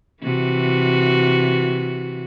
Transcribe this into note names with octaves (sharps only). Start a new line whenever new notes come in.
C3 E3 F#4